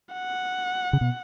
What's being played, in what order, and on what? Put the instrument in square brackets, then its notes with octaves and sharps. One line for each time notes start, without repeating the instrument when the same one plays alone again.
[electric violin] F#5
[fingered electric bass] C#3
B2